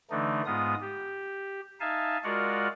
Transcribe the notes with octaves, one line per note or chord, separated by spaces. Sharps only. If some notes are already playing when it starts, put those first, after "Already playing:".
D3 E3 A3 D4 D#4
G#2 G#3 B3 F4 D#6
G4
D#4 E5 F5 G#5 A5
G#3 F4 F#4 A#4 D5 F#5